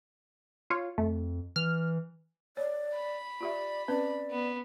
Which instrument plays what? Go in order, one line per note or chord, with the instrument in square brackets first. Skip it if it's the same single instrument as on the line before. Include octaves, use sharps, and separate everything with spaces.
[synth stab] F4 C#5
[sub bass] F2 [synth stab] A3
[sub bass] E3 [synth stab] F6
[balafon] C#5 [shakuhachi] D5
[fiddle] B5
[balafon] F4 G4 E5 [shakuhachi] D5
[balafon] C4 C#4 B4 [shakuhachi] D5
[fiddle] B3